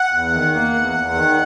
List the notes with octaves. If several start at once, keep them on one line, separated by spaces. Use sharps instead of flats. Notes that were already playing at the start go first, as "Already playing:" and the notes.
Already playing: F#5
E2
D#3
A#3
E2
E2
D#3